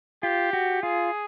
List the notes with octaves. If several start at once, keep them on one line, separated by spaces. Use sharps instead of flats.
F4 G4
F#4
F4 G#4